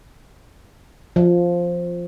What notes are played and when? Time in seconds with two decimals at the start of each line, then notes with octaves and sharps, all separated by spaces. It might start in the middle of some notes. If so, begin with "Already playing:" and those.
1.16 F3